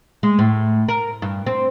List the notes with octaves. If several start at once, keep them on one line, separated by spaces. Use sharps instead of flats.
G#3
A2
A#4
G2
C4